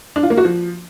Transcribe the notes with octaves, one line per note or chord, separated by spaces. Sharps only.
D4
F4
A#3
F#4
F3